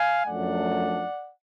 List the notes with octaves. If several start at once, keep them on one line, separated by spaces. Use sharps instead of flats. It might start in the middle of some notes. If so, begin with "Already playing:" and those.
Already playing: F5 G#5
F#2 F3 A3 D4 D5 F#5